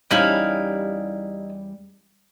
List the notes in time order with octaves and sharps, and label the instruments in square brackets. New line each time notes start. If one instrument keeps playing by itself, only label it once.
[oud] E2 G3 C#4 [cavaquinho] D#4 E4 F5